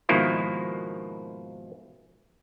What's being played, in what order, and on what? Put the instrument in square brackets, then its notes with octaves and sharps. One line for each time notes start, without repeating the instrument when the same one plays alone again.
[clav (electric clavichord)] G#2 B2 D#3 F3 A#3 E4